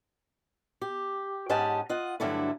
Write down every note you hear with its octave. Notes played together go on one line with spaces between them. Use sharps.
G4
G#2 C#4 G4 D#5 F#5 A5
F4 D#5 F#5
G2 D3 F#3 A3 D4 E4